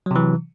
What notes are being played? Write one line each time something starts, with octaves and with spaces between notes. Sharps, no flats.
C3 E3 F#3